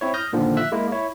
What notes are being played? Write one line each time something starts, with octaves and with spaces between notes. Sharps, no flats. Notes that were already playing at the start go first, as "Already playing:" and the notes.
C4 E4 C#5
D#6 F6 G6 A#6
A#2 D3 D#3 F3 A#3
E5 E6 F#6
G#3 A#3 E4
E4 C#5